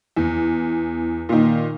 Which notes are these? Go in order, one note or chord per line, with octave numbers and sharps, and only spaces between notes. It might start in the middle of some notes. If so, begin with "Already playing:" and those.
E2
A#2 D#3